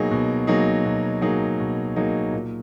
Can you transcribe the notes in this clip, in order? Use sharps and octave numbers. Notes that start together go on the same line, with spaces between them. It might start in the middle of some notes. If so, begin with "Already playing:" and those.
Already playing: B2 F#3 A#3 D#4 G#4
B2
F#3 A#3 D#4 G#4
B2
F#3 A#3 D#4 G#4
B2
F#3 A#3 D#4 G#4
A#2